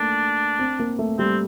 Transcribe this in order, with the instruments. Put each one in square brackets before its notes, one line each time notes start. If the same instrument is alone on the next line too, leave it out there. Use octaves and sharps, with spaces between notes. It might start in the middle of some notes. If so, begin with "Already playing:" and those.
Already playing: [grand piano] A3 A#3 [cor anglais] D4
[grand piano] C4
A#3
A3
[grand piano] G3 [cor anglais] C4